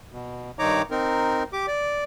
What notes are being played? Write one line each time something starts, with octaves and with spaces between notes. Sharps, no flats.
B2
G2 D#3 D#4 C#5 A#5 D6
C4 D#4 A#4
G4 D6
D5